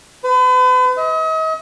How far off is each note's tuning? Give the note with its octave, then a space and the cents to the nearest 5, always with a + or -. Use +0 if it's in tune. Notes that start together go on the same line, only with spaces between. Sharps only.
B4 +40
D#5 +40